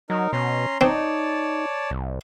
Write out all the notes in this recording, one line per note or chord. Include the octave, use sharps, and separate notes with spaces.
F#3 D#4 A#4
B2 C#4 A#5 C6
C4 D#4 C#5 D5 A5
C2